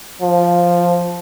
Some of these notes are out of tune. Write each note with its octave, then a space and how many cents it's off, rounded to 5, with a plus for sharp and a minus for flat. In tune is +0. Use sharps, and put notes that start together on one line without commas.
F3 +0